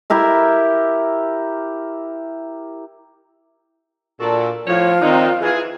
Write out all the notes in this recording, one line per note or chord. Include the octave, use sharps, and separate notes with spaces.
E4 G4 A#4 E5
A#2 D4 F#4 A4
A2 F3 F4 C#5
D#3 A#3 C4 D4 D#4
E3 G#4